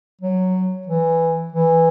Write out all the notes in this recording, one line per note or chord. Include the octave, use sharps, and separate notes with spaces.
F#3
E3
E3